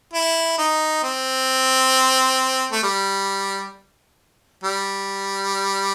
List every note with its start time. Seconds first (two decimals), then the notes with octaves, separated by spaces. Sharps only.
0.13 E4
0.58 D#4
1.04 C4
2.72 A3
2.84 G3
4.64 G3